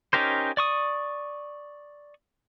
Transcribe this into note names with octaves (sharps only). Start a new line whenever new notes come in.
C#4 D#4 G4 A#4 C5
D5 C#6 D#6